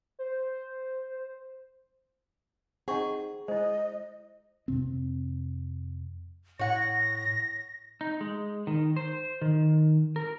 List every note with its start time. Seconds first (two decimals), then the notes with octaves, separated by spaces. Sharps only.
0.19 C5
2.88 C4 D#4 G#4 F#5 C#6
3.48 G#3 E4 C5 D#5
4.68 F2 C3 C4
6.59 A2 C#5 F#5 A#6
8.01 D#4
8.21 G#3
8.67 D#3
8.96 C5
9.41 D#3
10.16 A#4